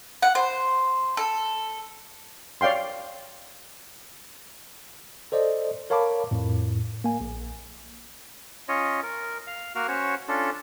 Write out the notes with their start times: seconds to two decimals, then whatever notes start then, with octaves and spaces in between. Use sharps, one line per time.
0.22 F#5
0.35 C5
1.17 A4
2.61 C#5 D5 F5 G5 C6
5.32 A4 C5 D5 D#5
5.90 A#4 C#5 F5 A5 B5 D6
6.31 F2 A2
7.04 A#3 G#5
7.21 A#1
8.68 C#4 F4 C#5 D#5
9.03 A#4
9.47 F5
9.75 A#3 F#4 A#4 F5
9.88 C#4 F#4 C5 C#5
10.28 C#4 D4 F4 A4